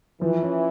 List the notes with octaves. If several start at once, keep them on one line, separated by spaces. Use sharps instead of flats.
E3 F3
C#4